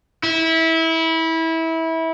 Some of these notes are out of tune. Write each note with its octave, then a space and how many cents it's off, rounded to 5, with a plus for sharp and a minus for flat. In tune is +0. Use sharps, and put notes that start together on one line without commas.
E4 -20